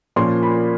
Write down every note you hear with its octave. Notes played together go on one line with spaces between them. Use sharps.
A#2 F3 A#3 C#4 C6
B5